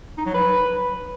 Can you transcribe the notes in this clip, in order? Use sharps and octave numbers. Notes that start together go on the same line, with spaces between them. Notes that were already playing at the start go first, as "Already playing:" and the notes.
D#4
F#3
B4